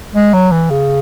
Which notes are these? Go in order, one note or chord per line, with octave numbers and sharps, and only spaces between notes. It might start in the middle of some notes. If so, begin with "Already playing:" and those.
G#3
F#3
E3
C#3